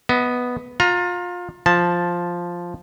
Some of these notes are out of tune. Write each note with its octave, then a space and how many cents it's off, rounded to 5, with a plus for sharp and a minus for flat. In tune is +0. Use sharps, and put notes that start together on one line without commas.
B3 +0 D#5 +40
F4 +25 A#5 +0
F3 +0 A5 +0